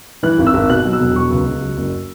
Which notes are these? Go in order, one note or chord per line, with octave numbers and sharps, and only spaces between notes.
E3 F#6
G#1
E6
G#1
B2 F#6
F#3
E6
E1
F#3 C#6
C#2
C#2
F#3
F#1